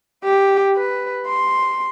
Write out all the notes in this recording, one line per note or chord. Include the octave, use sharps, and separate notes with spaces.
G4
B4
C6